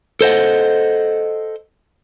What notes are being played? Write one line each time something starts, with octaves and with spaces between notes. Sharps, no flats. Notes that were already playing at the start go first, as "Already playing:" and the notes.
A4 C5 D#5 F#5